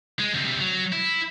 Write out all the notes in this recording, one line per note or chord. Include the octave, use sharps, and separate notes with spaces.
G#3
D2 C3
F#3
E4